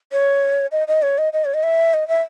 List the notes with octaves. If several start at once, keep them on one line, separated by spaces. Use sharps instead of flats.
C#5
D#5
D#5
C#5
D#5
D#5
C#5
D#5
E5
D#5
E5